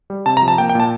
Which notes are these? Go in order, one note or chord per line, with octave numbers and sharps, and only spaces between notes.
G3
C3 A5
A#5
F3
A5
A#3 G5
G5
A#2 A5